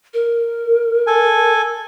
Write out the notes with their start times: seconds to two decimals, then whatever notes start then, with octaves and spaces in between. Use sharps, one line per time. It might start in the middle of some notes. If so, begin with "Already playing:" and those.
0.14 A#4
1.07 A4 G#5